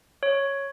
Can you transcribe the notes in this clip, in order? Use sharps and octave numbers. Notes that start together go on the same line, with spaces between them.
C#5